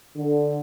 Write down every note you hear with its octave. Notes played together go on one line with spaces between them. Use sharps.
D3